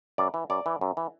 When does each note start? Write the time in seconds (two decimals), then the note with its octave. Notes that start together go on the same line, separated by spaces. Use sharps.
0.18 F#2 D5
0.34 E3
0.50 F#2 D5
0.66 E3
0.81 F#2
0.97 E3